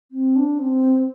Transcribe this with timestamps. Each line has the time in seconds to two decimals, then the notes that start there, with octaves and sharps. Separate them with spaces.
0.11 C4
0.36 D4
0.59 C4